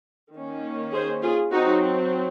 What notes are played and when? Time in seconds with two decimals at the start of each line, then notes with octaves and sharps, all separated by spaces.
0.34 D#3 A#3 C#4
0.93 G#4 C5
1.22 F4 G#4
1.51 F#3 C4 D#4 F#4